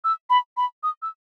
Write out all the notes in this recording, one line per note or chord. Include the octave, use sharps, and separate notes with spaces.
E6
B5
B5
D#6
E6